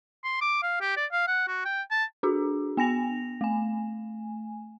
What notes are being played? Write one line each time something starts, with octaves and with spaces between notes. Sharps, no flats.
C6
D6
F5
G4
D5
F5
F#5
F#4
G5
A5
D4 F#4 G#4
B3 G#5 A#6 F7
A3 G#5